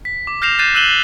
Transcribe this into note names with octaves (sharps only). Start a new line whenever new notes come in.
B6
D6
F6 G6 A#6 C7 E7 F7
F#6 G6 A6 C7 D#7 E7
E6 F#6 D#7 E7 F#7 G7